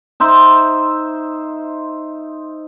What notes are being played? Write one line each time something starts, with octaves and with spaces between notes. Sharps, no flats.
D#4 C5 E5